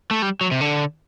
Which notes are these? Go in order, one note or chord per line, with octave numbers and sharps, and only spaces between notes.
A3
G3
F#3
C3
D3